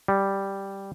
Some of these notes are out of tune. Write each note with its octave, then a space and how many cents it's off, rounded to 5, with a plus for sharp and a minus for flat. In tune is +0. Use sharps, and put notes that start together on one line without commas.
G3 +0